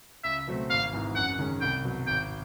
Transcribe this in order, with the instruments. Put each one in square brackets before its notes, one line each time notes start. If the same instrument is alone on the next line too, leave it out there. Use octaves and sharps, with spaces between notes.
[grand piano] C#2 [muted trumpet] E5
[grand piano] B2 F#3 A3 C4
[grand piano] G#1 [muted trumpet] F5
[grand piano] G#2 E3
[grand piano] F#2 [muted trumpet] F#5
[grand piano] D#3 G#3 C#4
[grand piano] C2 [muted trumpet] G5
[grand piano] B2 F#3
[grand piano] G#1 [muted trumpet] G5